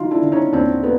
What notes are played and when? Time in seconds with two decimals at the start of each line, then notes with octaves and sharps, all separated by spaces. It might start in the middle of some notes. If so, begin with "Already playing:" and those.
Already playing: D3 F#3 D#4 F4
0.11 D4 E4
0.22 D3
0.32 C#4 D#4
0.52 D#2 C4 D4
0.83 B3